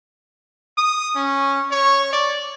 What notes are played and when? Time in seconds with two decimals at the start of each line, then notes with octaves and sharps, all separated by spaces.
0.77 D#6
1.16 C#4
1.71 C#5
2.12 D5